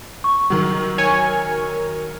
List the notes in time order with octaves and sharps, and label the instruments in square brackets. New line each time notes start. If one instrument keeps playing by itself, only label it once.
[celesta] C#6
[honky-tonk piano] D#3 F#3
[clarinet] A#4 [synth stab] C#5 G#5